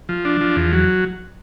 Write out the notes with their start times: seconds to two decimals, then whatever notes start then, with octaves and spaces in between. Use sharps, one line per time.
0.09 F3
0.25 D4
0.41 F3
0.56 E2
0.73 F#3